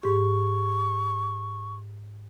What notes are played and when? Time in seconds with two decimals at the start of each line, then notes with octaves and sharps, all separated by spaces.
0.03 G#2 G4 C#6